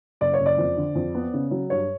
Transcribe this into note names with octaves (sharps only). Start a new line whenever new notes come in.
F#1 D5
C#5
F#1
D5
F2
D3
F2
B3
C#3
F#3
G2 C#5